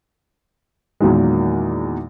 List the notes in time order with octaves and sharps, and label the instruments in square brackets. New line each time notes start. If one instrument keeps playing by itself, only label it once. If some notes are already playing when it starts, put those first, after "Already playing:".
[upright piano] E2 A#2 D#3 F#3 G#3